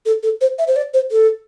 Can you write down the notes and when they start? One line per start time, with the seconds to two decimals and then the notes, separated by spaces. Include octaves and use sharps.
0.05 A4
0.23 A4
0.41 C5
0.58 E5
0.67 C5
0.76 D5
0.93 C5
1.11 A4